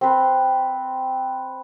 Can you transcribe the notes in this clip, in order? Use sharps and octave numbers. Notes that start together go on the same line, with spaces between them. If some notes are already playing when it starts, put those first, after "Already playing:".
C4 B4